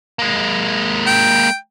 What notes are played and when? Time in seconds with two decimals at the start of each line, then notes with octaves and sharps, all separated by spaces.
0.19 G#3 A#3
1.07 G5